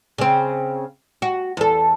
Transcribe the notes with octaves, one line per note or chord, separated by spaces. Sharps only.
C#3 C4
F#4
E2 A4